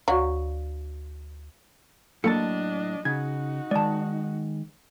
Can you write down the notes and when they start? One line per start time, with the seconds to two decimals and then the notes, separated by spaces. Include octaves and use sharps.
0.08 D2 F#3 F#4 D5 F5 C#6
2.24 A2 F#3 A#3 D4 A4 D#5 A5 C#7
3.05 C#3 D#4 F#4 G#6
3.71 D#3 G#3 D5 A5